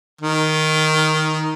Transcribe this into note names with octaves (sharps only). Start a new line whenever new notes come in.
D#3